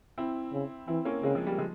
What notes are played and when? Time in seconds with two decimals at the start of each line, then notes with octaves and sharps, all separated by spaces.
0.18 C4 E4
0.53 C#3
0.88 E3 C4 E4
1.05 A#3 C#4
1.23 C#3 G#3 C4
1.35 F3 G#3
1.47 G3 A#3
1.58 F3 G#3